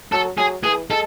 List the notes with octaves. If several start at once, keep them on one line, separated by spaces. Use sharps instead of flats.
F#3 A4
F#3 G#4
E3 G#4
G#3 A4